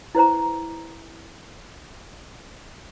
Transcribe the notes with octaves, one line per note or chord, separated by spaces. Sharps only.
E4 B4 C5 A#5